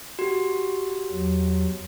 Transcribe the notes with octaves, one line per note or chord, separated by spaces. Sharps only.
F#4 G4
E2 F#3